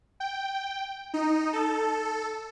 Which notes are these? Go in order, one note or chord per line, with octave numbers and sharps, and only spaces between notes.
G5
D#4
A4